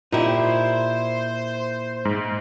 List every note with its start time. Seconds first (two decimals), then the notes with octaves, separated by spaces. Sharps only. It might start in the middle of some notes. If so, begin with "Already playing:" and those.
0.12 A#2 D#4 E4 G4 C5
2.05 G#2